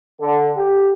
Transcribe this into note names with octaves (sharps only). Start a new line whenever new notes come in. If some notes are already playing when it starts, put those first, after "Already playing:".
D3
G4